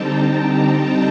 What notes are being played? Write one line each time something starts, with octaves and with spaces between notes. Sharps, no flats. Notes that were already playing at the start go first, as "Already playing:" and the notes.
Already playing: D3 G3 C4 D#4 G5 A5 A#5
G5